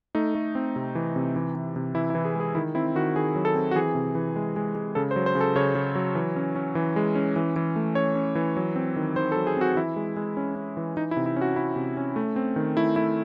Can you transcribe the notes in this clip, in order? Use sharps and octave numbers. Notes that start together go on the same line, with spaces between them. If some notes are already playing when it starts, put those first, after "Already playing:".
A3 D#4
A3
C4
C3
E3
C3
E3
E3
C3
E3 E4
E4
E3
G#4
G#3 G#4
D#3 E4
C4 E4
D#3 F#4
D#3 G#4
F#3
A4
C4
F#4
E3 G#4
C3
E3
G#3
G#3
G#3
C#3 A4
C5
F#3
C5
C#3
A4
C#3 C#5
C#3
F#3
E3
C#4
C#4
E3
G#3
C#4
E3
E3
A3
C#4 C#5
C#4
E3
F#3
C4
D#3
D#3 C5
A4
F#3
G#4
C4 F#4
E3 E4
G#3
G#3
C#4
C#4
E3
E3 D#4
E4
C3
E4
C#4
F#4
C#4 E4
C3
C#4
A3
C4
D#3
A3 E4
A3 E4